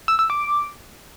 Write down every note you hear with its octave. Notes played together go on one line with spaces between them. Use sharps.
E6
E6
D6